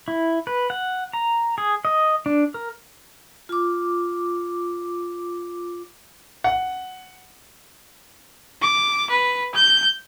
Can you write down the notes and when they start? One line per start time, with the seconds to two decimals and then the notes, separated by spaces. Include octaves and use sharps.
0.08 E4
0.47 B4
0.70 F#5
1.13 A#5
1.58 G#4
1.85 D#5
2.26 D4
2.54 A#4
3.49 F4 D6
6.44 F#5
8.62 D6
9.11 B4
9.55 G6